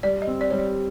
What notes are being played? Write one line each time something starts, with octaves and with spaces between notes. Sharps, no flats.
G3 D5
D#5
C4
D5
G3 C#5
D5